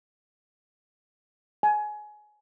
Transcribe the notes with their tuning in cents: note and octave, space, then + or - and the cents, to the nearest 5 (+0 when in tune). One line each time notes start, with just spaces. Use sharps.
G#5 +20